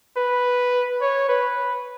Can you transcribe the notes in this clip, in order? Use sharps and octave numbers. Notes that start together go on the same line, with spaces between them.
B4
C#5
B4